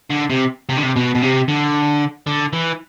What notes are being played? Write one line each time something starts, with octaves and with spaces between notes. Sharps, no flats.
D3
C3
C3
D3
C3
B2
B2
C3
D3
D3
E3